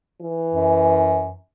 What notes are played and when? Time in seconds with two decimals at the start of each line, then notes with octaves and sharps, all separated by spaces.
0.21 E3
0.54 F#2